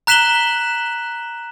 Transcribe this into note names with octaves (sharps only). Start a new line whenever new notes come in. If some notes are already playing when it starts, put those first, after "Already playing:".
A#5 F#6 B6 E7 F#7 G7